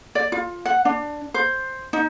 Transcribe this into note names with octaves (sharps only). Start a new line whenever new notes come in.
D5
F4
F#5
D4
C5
D#4